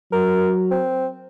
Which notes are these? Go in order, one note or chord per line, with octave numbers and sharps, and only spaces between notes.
F#3 A#4
C4